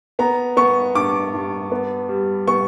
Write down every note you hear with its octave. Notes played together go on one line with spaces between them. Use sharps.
B3 A#5
B3 C#6
G2 D6
G2
B3
G3
B3 C#6